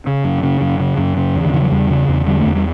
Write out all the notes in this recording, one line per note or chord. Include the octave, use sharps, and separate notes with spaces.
C#3
F#2
C#3
F#2
C#3
F#2
C#3
E2
D3
C#3 E3
F#3
E2 G3
C#3
E2
D3 G3
A3
E2
G3